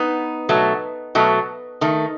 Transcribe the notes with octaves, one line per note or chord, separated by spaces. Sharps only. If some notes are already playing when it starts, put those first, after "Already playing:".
Already playing: B3 D#4
B2 F#3 A3
B2 F#3 A3
D#3 A3